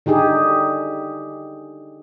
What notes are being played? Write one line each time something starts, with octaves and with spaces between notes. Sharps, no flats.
D3 D#4 G4 G#4